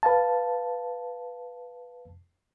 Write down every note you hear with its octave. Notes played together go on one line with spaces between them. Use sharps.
B4 F5 A5